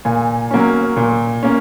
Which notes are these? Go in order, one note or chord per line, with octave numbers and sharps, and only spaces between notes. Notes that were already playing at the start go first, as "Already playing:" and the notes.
A#2 G#5
F#3 A#3 C#4
A#2
A#3 C#4